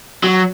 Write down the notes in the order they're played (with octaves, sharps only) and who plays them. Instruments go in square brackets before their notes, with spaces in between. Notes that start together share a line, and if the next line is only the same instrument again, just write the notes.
[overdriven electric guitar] F#3